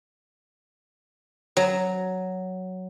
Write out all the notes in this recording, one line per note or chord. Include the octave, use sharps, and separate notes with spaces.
F#3